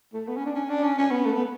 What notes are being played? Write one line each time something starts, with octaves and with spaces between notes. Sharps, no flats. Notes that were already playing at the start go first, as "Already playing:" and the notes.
A3
B3
C#4
D4
C#4
D4
C#4
C#4
B3
A3
B3